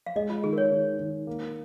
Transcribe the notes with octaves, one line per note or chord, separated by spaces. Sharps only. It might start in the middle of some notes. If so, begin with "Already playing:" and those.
F5
G#3 D#5
F4
D#3 G#4
A#4
C#5
D#3
D#3
A#3